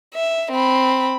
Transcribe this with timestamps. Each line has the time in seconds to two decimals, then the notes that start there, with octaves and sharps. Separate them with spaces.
0.14 E5
0.52 C4 B5